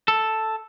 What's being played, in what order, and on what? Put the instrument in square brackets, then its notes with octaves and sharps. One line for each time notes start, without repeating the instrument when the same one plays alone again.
[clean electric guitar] A4